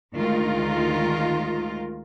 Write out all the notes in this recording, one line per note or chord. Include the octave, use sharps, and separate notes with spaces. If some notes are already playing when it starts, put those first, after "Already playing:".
D2 D#3 G#3 F4 A#4